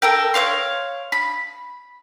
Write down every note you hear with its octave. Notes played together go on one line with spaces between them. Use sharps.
A4 A#4 G5
C#5 D5 F5 C6
B5